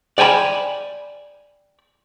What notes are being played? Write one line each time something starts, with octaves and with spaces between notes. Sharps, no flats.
D5 G5 G#5 A#5 B5